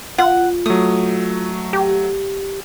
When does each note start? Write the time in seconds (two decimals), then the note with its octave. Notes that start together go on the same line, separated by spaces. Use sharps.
0.18 F4 F#5
0.66 F#3 A3 D#6
1.73 G4